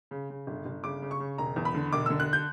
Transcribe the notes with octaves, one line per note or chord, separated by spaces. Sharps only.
C#3
C#3
G1
G1
C#3 D6
C#3
C#6
C#3
E1 A#5
E2
B5
D3
E1 D6
D3 E6
F#6
G6